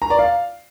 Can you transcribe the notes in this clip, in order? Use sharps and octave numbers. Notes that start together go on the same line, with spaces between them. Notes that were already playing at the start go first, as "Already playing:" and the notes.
A#5
D5
F5